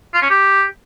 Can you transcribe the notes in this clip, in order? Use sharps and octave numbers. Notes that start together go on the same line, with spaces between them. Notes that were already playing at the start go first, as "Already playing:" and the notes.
F4
C#4
G4